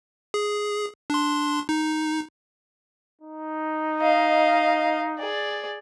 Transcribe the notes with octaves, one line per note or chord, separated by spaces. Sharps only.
G#4
D4 C6
D#4
D#4
D#5 F5
G#4 D5